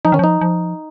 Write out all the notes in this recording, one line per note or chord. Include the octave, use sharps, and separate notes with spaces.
F3 D#4
D#3 C#4
F3 D#4
F3